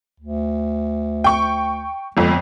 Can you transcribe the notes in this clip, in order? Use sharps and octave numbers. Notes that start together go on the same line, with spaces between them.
D2
G5 C#6
G1 F2 G#3